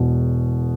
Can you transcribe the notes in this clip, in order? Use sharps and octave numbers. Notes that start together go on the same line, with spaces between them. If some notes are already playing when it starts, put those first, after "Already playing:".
Already playing: E1 E2 B2